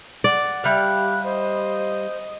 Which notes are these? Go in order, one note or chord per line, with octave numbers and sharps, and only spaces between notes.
D5 F#5
G3 E4 G4 F5 F#6
C5 D#5